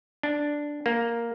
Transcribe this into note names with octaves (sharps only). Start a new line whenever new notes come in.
D4
A#3